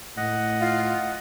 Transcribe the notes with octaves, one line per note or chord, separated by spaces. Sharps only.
A2 D#5 F#5
F4